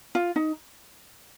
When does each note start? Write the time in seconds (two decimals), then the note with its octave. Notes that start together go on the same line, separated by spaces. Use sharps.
0.15 F4
0.36 D#4